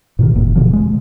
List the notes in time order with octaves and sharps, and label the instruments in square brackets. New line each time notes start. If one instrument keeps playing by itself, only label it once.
[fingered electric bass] G#2 B2 D#3
F#1 E2 A#2
B2 D3 F3
G#3